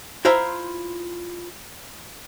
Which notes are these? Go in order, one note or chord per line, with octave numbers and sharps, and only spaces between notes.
E4 F4 C5 E5 A#5